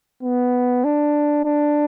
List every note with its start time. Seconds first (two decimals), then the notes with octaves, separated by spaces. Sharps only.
0.23 B3
0.84 D4
1.45 D4